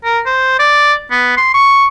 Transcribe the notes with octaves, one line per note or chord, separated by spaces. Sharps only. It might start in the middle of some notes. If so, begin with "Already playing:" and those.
A#4
C5
D5
B3
C6
C#6